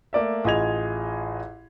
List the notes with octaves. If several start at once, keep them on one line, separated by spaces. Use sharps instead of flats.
A3 A#3 D5 E5
A1 F4 G#4 D#5 G#6 F7